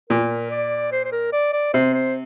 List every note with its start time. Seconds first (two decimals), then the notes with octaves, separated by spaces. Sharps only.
0.10 A#2 A#4
0.51 D5
0.92 C5
1.04 C5
1.12 A#4
1.33 D5
1.53 D5
1.74 C3 C5
1.94 C5